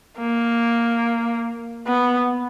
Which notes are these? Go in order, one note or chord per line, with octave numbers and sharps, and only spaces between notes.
A#3
B3